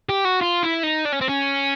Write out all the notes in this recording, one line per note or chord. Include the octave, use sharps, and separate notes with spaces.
G4
F#4
F4
E4
D#4
D4
C#4
C4
C#4